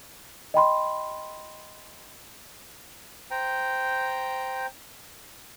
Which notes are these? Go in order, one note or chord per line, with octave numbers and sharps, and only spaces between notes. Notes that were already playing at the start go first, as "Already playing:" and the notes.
D#5 G5 B5 C6
C5 G5 A#5